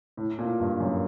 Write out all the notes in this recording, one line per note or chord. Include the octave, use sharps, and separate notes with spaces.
A2
A#2
G2
F#2